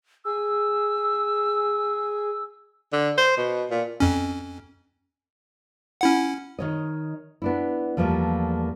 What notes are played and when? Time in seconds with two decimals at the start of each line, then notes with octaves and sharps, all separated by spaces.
0.25 G#4 E6
2.93 D3
3.18 C5
3.37 B2
3.71 A#2
4.00 F2 C#4
6.01 C#4 E4 F#5
6.59 D#3 C#5 D#5
7.42 B3 D4 E4
7.97 E2 F3 G3 A3 A#3